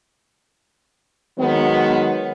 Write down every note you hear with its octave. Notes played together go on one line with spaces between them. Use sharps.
D#3 F#3 G#3 B3